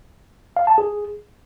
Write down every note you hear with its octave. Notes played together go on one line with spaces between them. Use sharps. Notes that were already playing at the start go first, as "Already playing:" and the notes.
F5
A5
G#4